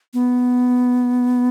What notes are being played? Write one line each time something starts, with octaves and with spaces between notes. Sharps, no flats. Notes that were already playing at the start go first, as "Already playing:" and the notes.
B3